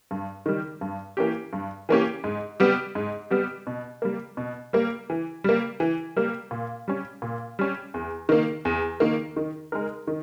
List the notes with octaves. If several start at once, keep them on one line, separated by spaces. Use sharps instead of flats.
G2
D#3 G3
G2
E3 A#3 C#4 G4
G2
E3 A#3 C#4 G4
G#2
G3 B3 G4
G#2
G3 B3 G4
B2
G3 A#3
B2
G3 A#3
E3
G3 A#3
E3
G3 A#3
A#2
G3 C#4
A#2
G3 C#4
E2
D#3 A#3
E2
D#3 A#3
D#3
G#3 D#4 A#4
D#3